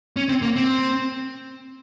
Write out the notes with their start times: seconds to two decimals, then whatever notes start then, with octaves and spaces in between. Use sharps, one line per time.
0.17 C#4
0.29 C4
0.42 A#3
0.56 C4